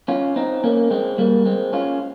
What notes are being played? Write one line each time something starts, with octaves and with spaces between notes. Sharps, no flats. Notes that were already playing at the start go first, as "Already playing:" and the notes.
C#4 F4
C4 D#4
A#3 C#4
G#3 C4
G3 A#3
G#3 C4
C#4 F4